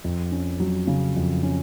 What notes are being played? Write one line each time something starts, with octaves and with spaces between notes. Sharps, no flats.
F2
C#4
F#3
C#3
F2
C#4